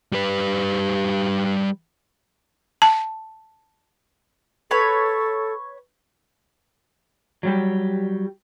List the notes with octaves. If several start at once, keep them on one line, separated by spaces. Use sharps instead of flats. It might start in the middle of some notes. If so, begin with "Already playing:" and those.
G3 B4
A5
A4 B4 C#5 B5
F#3 G3 G4